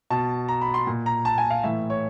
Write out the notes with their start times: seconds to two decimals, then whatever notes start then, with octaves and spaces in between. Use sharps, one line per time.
0.10 B2 A5
0.48 A#5
0.61 B5
0.74 C6
0.87 A#2
1.06 A#5
1.25 A5
1.38 G#5
1.50 F5
1.63 A2 E3 E5
1.90 C#5